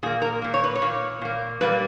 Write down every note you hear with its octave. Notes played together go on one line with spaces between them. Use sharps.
A#2 A#3 G#4
A#4
A#2 A#3
C#5
B4
C#5
A#2 A#3
A#2 A#3
A#2 G3 A#3 B4